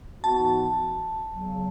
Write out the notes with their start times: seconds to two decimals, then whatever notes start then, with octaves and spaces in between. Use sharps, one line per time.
0.23 G#2 E3 B3 D#4 F#4 A5
1.30 E2 C#3 F#3